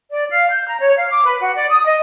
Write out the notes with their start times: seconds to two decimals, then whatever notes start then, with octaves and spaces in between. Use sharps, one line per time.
0.10 D5
0.31 F5
0.51 G6
0.68 A#5
0.80 C#5
0.97 F5
1.11 D6
1.25 B4
1.41 F#4
1.56 D5
1.70 D#6
1.86 D#5